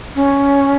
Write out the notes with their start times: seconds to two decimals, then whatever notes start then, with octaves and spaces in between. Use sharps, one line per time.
0.15 C#4